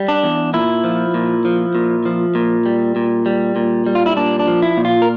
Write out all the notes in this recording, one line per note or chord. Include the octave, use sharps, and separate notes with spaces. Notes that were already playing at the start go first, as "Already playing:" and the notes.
Already playing: G3
D4
E2
A#2 E4
F3
A#2
F3
A#2
F3
A#2
G3
A#2
G3
A#2
G3
F4
E4
A#2 D4
D4
F3
E4
A#2
F4
A#4